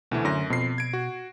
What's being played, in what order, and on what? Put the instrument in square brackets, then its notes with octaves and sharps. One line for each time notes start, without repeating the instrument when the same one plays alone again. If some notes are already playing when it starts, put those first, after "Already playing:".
[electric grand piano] D2 E3 A3 [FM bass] B2
[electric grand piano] F#2 A#6 [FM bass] D3
[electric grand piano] F2 C7 [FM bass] B2
[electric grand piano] G#6 D7
F#4